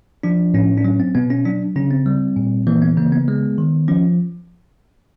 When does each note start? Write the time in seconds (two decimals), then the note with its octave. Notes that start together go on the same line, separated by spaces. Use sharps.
0.23 F3 D4
0.54 A2 C#4
0.78 D4
0.84 F#3 C#4
1.00 C4
1.15 B2 B3
1.30 C#4
1.45 F#3 D4
1.76 C#3 C#4
1.91 C4
2.06 G3
2.36 A#2
2.67 E3 A#3
2.82 B3
2.97 C#3 A#3
3.12 B3
3.28 G#3
3.58 D#3
3.88 F3 C#4